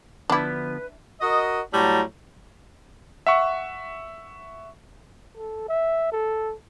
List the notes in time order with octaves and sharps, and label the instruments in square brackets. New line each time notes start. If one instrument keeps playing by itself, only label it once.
[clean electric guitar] D3 F3 B3 [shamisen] D4 E4 [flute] B4
[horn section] F#4 A#4 D#5
A2 F#3 G3 A5 A#5
[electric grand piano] E5 F#5 C#6
[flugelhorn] A4
E5
A4